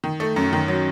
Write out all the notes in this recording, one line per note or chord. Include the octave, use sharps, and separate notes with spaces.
D#3
A3
F#2
D#3
F#3